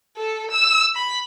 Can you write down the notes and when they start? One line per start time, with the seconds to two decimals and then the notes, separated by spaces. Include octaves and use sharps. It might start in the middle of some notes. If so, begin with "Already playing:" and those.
0.17 A4
0.51 E6
0.95 B5